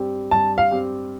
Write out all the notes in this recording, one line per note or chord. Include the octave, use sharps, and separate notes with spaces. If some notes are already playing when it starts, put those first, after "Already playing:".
Already playing: G2 G3 C4 G4
G2 A5
F5
G3 C4 G4